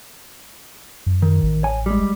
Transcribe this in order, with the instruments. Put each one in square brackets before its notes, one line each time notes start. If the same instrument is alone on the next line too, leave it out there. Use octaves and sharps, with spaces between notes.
[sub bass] F#2
[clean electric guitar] D#3
[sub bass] A1
[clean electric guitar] C#5 G#5
G3 G#3